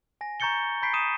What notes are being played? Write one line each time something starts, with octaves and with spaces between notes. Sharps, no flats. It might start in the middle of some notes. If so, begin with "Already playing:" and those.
G#5 A#6
A#5 C#6 G6 A6 C#7 G7
A#5 B5 G6 B6 C7 D7
D#6 D#7 E7